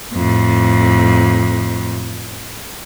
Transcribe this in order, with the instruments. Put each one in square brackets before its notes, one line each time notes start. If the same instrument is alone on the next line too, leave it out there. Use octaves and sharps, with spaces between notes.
[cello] F2 A2